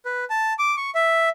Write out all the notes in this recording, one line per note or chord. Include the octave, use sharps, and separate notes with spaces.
B4
A5
D6
C#6
E5